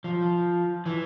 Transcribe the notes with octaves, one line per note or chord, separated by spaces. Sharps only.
F3
E3